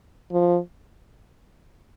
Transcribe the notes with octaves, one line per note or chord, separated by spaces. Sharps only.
F3